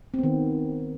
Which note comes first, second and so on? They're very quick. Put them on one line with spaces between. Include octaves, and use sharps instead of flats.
C4 B3 D#3